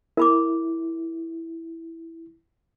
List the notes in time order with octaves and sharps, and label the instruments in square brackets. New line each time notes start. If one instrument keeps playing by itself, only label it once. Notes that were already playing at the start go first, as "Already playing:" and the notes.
[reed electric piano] E4 [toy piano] A#4 B5 D6